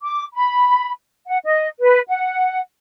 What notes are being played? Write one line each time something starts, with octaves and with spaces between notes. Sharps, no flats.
D6
B5
F#5
D#5
B4
F#5